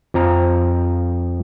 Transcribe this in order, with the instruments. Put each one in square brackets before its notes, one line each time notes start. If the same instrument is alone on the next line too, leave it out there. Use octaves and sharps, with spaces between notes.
[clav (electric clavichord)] F2 F3 A#5